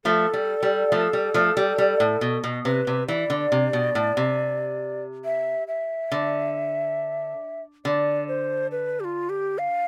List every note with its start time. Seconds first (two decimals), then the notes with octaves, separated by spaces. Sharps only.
0.05 F3 A3 A4
0.34 G3
0.63 G3
0.92 F3 A3
1.13 G3
1.34 F3 A3
1.57 G3
1.78 G3
2.00 A2
2.21 B2
2.44 B2
2.65 C3 B4
2.87 C3
3.08 E3 D5
3.30 D3
3.52 C3
3.73 B2
3.95 A2
4.17 C3
5.25 E5
5.68 E5
6.12 D3
7.85 D3 D5
8.28 C5
8.71 B4
9.00 G4
9.04 F4
9.29 G4
9.58 F5